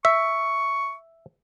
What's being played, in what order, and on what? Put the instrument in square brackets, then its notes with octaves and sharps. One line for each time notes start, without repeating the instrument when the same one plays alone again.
[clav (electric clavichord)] E5 [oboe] C#6